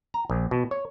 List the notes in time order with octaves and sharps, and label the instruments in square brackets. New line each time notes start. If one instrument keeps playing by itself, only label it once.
[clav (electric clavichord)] A#5
A#1
B2
C#5